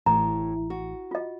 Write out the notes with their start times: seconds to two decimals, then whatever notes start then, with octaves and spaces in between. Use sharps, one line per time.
0.06 A1 A2 A#5
0.70 F#4
1.11 F4 D#5